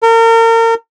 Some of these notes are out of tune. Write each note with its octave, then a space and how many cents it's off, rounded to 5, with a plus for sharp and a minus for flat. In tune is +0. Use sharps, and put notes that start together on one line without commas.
A#4 -35